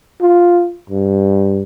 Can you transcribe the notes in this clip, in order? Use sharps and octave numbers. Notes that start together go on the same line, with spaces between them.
F4
G2